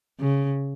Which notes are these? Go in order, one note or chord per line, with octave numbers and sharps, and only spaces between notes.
C#3